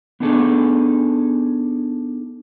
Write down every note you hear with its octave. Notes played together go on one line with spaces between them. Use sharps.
B3 D4 D#4 G#4 A4